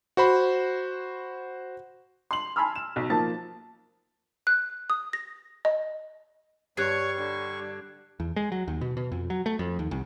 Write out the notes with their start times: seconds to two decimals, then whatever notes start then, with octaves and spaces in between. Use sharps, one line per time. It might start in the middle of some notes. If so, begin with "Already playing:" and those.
0.17 F#4 C5 B5
2.31 C6 F#7
2.56 G#5 A5 B5 C6 E6 F6
2.76 E7
2.96 B1
3.10 F3 A#3 D#4 A5 A6
4.47 F#6
4.90 D#6
5.13 A#6
5.65 D#5
6.77 G2 G3 C#5 C#6 F#6 G#6 C7
7.18 D3
8.20 E2
8.36 G#3
8.52 F#3
8.68 D#2
8.81 B2
8.97 B2
9.12 F2
9.30 F#3
9.46 A3
9.59 F2
9.79 D#2
9.91 C2